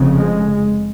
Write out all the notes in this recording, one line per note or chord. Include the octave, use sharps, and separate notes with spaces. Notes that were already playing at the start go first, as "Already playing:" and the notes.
Already playing: F1 F2 C#3
G#3